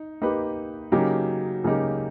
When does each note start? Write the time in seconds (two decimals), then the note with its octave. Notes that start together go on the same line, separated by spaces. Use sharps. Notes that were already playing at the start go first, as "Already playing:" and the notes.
Already playing: D#4
0.21 A#3 D#4 G4 B4
0.92 C#3 F#3 A#3 D#4 G4
1.64 C#3 F#3 A#3 D#4 G4